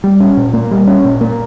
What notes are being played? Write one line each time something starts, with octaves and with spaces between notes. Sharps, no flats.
G3
C#4
A#2
A#3
G3
C#4
A#2
A#3